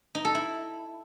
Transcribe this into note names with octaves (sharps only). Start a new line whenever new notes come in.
D#4
A4
E4